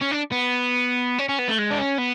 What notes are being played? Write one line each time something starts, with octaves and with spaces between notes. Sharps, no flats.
C#4
D4
B3
C#4
C#4
B3
A3
G#3
D4
C#4
B3